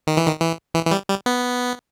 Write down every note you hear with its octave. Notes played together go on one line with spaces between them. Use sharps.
D#3
E3
D#3
E3
E3
E3
G3
G3
B3